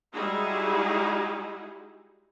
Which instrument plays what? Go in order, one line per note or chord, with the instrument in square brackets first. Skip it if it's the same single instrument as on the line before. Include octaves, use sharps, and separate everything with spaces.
[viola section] G3 G#3 D#4 E4 F#4 G#4